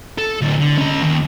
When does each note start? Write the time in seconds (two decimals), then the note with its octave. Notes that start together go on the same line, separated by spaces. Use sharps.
0.18 A4
0.41 D2 A2
0.60 D3
0.78 C#4 D#5
1.02 D#2